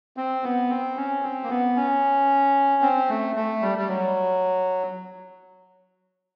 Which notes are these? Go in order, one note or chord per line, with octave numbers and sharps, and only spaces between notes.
C4
B3
C4
C#4
C4
A#3
B3
C#4
C4
A3
A3
G3
G3
F#3